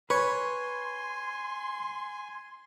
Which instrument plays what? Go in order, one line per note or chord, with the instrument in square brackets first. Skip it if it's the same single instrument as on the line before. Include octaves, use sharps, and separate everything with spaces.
[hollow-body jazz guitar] B4 [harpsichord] C#5 [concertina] G#5 [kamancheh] C6